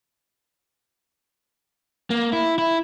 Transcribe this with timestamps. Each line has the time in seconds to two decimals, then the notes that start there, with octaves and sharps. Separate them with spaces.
2.10 A#3
2.33 E4
2.58 E4